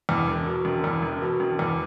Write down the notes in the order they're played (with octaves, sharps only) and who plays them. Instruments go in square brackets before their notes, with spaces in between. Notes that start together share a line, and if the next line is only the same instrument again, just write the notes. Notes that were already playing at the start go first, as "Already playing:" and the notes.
[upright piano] E2
E1
B2
E1
E2
E1
B2
E1
E2